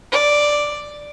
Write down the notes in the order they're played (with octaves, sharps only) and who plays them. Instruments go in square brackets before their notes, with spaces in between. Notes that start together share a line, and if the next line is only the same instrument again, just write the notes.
[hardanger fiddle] D5